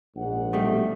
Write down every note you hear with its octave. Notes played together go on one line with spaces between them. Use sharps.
A#1 G#2 F#5
B2 G3 A3